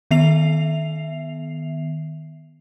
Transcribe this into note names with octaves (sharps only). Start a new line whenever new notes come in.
D#3 B3 E5 C7 F7